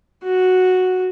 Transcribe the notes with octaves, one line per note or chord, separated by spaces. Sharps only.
F#4